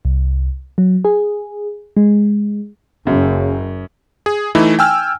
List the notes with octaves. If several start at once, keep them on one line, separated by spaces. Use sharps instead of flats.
C2
F#3
G#4
G#3
F#1 F#2 C#3
G#4
E3 A3 D#4 E4
G5 G#5 E6 F6